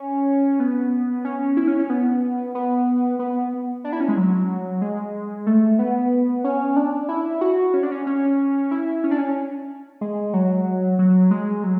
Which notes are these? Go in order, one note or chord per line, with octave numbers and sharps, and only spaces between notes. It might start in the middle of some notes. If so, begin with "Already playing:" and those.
Already playing: C#4
B3
C#4
E4
C#4
C#4
B3
B3
B3
D4
E4
C#4
G#3
F#3
G#3
A3
B3
C#4
D4
E4
F#4
C#4
D4
C#4
C#4
E4
C#4
D4
C#4
G#3
F#3
F#3
G#3
F#3